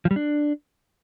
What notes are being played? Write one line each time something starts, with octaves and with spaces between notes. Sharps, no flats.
F3
G3
D4